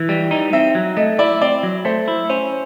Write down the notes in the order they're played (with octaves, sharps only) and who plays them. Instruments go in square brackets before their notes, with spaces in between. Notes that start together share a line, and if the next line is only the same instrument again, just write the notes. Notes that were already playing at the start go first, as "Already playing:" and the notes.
Already playing: [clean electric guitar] E3
G3
D#4
[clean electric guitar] C4 [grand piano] E5
[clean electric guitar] F#3
[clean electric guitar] A3 [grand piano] D#5
[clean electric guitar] E4 [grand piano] D5
[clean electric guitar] C4 [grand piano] D5
[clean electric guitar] F#3
[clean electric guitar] A3 [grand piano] C5
[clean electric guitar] E4
[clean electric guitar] C#4 [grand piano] C5